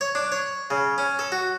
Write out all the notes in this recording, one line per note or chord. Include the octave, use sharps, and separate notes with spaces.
C#5
D4
C#5
C#3
C#4
A4
F#4